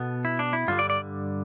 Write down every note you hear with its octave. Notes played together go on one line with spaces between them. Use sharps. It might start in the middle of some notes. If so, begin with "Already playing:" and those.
Already playing: B2 B3 A4
E4
D4
E4
G2 D3 G3 F4
D5
D5